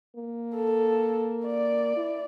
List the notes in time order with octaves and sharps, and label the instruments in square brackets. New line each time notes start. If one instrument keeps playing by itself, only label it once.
[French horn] A#3
[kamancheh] A4
D5
[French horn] E4